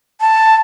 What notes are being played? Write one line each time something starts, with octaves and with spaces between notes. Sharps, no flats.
A5